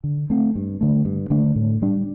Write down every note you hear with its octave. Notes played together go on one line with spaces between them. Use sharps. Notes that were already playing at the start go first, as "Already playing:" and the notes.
D3
A3 C4
G2
D3 A3
G2
D3 A3 D4
A2
G3 D4